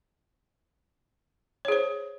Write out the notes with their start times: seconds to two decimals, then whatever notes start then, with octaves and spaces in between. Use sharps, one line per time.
1.65 C#5
1.68 G#4
1.72 C5